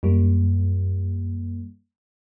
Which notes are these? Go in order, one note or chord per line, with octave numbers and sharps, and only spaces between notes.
F#2 G3 A#3